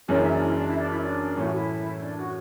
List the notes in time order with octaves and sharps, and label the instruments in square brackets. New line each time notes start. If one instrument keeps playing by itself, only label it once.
[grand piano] F#1 F#2 E3 G#3 C#4 [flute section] D4
[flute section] E4
D4
E4
D4
E4
D4
E4
D4
[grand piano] A2 E3 A3 C#4 [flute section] E4
[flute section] F#4
E4
D4
F#4